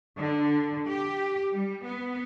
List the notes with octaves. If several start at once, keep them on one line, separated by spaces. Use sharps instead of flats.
D3
G4
G3
B3